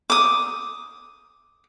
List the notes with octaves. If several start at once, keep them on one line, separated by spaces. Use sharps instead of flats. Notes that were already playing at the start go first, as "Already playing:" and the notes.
D6 D#6